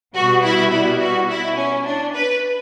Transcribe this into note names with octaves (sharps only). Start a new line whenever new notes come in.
B2 G3 B3 F#4
E4
E4
F#4
E4
C#4
D4
B4